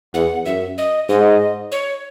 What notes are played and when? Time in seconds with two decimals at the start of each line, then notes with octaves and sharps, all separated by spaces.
0.14 E2 F#5
0.46 F#2 E5
0.78 D#5
1.09 G#2 D#5
1.72 C#5